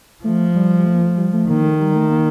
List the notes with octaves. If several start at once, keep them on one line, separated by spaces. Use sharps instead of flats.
F3 A3
G3
G3
A3
A#3
A3
G3
A3
D#3 A#3
A3
G3
A3
A#3